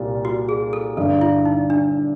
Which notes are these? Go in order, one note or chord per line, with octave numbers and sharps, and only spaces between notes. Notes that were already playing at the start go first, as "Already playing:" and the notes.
Already playing: C2 A#2 G3 F4
F#4
G#4
A4
G1 G2 D3 A4
E4
D#4
D4